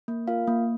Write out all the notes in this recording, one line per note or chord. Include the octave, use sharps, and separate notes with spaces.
A#3
F4 A#4 F5
A#3